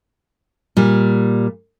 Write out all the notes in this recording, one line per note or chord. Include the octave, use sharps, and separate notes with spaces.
A#2 G3